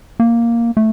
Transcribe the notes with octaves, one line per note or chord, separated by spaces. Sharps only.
A#3
A3